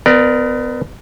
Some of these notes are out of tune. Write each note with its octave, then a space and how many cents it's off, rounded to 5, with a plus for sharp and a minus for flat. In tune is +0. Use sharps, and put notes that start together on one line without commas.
B3 +30 A#4 +0 D5 +25